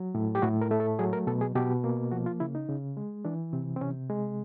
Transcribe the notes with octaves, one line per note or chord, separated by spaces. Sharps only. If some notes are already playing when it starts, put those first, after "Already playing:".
Already playing: F#3
A2
G4
A2 F#4
A#4
A3
A4
F#3 G#4
A#4
B2 A4
G#4
B2 G4
A#3
F3 F#4
F4
C#3 E4
D#4
C#3
G#3
E3 D4
C3 C4
C4
C3 C#4
G#3